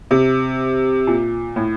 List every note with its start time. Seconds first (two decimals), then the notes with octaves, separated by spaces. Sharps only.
0.11 C3
1.07 A#2
1.56 A2